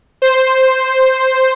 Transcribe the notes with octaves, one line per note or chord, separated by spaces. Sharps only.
C5